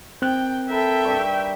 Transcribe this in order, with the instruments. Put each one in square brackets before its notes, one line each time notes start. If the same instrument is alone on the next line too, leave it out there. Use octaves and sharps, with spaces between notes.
[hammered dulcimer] D#3 [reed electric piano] C4 F#6 [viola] G5
[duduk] A4 [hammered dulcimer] A#4 B5 [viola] E5 G5
[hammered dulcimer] G2 G3 C#6